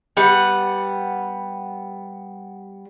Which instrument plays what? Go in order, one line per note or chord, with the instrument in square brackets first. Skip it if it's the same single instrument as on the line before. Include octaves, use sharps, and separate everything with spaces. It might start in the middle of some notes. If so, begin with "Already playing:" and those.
[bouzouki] G3 B3 F#5